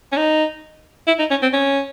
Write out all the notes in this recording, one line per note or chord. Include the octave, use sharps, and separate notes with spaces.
C#4
D#4
E4
D#4
C#4
C4
C#4